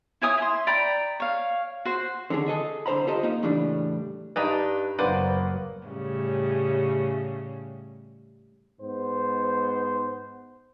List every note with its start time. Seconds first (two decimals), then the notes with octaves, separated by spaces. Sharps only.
0.22 E4 C#5 G#5 D#6
0.38 E4 C6
0.67 D5 G5 A#5 B5
1.20 C#5 F5
1.85 F#4 C5
2.30 D3 D#3 D4 G#4
2.46 G#4 A4 D#5 E5
2.86 C2 D3 C5 A#5 B5
3.07 F4 G4 A4 C5 D#5
3.23 A#3 D#4
3.43 A2 C#3 E3 G3 D4
4.36 G2 D4 D#4 B4
4.98 F#1 F#3 A#3 B3 B4 C5 D5
5.86 A2 C#3 G3
8.80 G#2 B3 C5